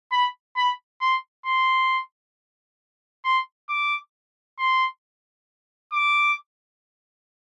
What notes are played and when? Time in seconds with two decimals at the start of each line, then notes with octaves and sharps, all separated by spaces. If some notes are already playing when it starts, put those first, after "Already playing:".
0.12 B5
0.56 B5
1.01 C6
1.46 C6
3.25 C6
3.69 D6
4.58 C6
5.93 D6